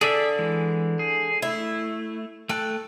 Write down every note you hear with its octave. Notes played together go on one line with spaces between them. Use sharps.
D3 G#4 D5 E5
E3 G#3
G#4
A3 E4
A3 A4 G5 F#6